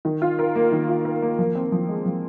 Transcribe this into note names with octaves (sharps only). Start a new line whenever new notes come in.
D#3
F4
A#4
A#3
D#3
F4
A#4
A#3
F3
C4
F3
G#3
F3